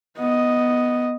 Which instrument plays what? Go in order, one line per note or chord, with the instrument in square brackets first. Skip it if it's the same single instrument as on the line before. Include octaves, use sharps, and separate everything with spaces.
[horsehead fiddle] B3 D#5